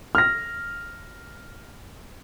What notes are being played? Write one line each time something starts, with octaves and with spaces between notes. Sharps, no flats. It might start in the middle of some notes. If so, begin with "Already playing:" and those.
F6 A#6